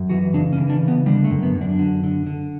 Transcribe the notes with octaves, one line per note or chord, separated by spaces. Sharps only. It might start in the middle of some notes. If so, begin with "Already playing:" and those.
Already playing: F#2
E3 F#4
C#3 D4
C#4
E3
D4
C#3
B3
D3 G3
A3
F#2
B3
F#2
D4
D3
D3
D3